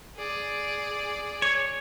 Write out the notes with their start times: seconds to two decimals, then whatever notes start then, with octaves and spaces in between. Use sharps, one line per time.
0.17 G#4 D5
1.42 C#5